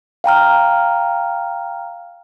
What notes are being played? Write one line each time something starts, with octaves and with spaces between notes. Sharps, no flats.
F5 G5 A#5 F6